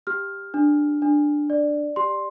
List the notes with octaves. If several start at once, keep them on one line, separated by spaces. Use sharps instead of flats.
G4 F6
D4
D4
D5
G4 C6